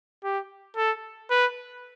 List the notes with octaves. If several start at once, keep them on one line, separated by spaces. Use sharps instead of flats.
G4
A4
B4